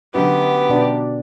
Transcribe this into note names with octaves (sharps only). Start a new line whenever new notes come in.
F#2 D3 B3 G4
B2 D4 D5